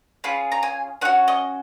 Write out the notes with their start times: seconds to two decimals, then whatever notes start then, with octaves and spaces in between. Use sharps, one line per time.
0.24 C#4 F4 G#4 B5
0.52 A#5
0.63 G#5
1.01 C#4 F#5
1.05 F#4
1.28 D#5